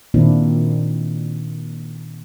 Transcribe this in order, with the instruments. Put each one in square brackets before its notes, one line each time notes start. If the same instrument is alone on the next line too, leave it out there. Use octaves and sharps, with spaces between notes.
[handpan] A#2 D#3 A#3 C4 D4 E4